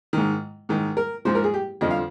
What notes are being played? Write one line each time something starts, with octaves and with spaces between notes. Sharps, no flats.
G#2 D#3
G#2 D#3
A#4
G#2 F3 C5
A#4
G#4
G4
F2 D3 F3 D#5
F5